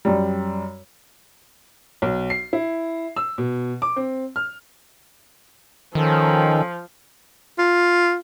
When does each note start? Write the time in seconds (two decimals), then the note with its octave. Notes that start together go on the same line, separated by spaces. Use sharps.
0.05 F#2 G3
2.02 B1
2.30 C7
2.53 E4
3.16 E6
3.38 B2
3.82 D6
3.96 C4
4.36 F6
5.95 D#3 F3 C#4 A4
7.58 F4